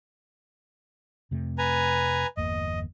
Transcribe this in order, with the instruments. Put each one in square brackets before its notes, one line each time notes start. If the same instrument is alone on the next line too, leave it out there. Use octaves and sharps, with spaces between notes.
[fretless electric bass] F2 C3 A3
[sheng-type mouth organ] B4 G#5 A#5
[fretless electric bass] G1 E2 A#3 [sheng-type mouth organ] D#5